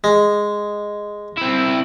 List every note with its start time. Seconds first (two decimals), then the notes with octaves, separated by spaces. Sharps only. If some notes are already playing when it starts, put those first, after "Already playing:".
0.04 G#3
1.37 C4 E4